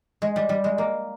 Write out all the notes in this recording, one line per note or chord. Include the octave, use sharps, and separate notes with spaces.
G#3
G3
G3
G#3
A#3